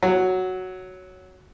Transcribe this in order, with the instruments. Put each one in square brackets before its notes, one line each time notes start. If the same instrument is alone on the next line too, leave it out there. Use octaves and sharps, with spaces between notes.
[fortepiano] F#3